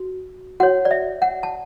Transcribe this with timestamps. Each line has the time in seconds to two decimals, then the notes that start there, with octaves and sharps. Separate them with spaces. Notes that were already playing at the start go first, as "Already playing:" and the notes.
Already playing: F#4
0.60 F#4 C#5 F#5
0.85 D5
0.91 E5
1.22 F#5
1.43 A5